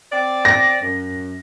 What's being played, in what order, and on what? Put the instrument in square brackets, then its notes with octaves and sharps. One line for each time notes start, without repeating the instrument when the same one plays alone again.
[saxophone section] C4 D5
[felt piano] A#6
[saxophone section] F#2